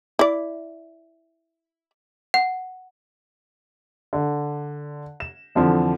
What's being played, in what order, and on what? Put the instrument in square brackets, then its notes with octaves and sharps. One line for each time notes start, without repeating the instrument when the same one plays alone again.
[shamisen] E4 D5
[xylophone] F#5
[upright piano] D3
E7
F2 D3 E3 F3